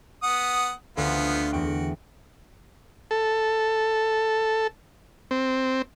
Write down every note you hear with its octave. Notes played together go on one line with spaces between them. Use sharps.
B3 F#5 D#6
D2 F3 B3 F4
E2 F#4 G5
A4
C4